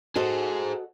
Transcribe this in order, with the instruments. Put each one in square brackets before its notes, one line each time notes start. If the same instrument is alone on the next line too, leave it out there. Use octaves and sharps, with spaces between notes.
[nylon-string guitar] F#4 A4 D#5 [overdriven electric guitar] G#4 C5